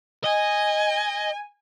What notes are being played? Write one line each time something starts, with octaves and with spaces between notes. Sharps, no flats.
D#5 G#5